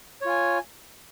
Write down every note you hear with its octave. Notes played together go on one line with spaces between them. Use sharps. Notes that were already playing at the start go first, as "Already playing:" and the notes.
F4 C#5 G#5